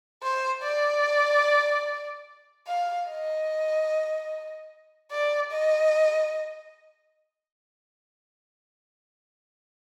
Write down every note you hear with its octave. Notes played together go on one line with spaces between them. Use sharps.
C5
D5
F5
D#5
D5
D#5